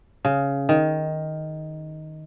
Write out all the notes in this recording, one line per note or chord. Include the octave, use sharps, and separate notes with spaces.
C#3
D#3